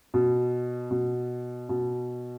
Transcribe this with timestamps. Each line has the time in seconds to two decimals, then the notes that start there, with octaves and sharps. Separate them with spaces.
0.14 B2
0.91 B2
1.69 B2